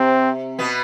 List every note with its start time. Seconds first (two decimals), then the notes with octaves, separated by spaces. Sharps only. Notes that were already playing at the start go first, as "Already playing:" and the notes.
Already playing: C3 C4
0.59 B2 B3